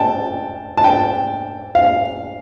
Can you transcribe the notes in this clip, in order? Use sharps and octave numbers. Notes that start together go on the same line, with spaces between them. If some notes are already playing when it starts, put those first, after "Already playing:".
Already playing: G5 A5
A5
G5
F5